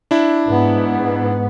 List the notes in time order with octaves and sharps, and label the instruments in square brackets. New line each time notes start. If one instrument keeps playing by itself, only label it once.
[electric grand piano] D4 E4
[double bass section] G#2 B3